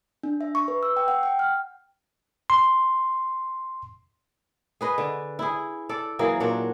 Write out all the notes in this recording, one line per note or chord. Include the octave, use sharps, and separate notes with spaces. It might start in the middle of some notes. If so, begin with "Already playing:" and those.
D4
E5
C#6
B4
E6
G5
F#5
G5
F6
C6
G#4 B4 D#5
D3
E4 G#4
A4 D5
E3 F#3 A#3 G#4
A#2 D4 F#4 C#5